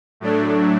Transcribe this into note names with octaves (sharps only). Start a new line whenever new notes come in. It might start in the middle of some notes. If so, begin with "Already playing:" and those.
A2 F#3 A3 D4